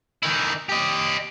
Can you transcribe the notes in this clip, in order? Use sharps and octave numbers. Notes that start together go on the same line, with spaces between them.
D#3 E4
G4 D#5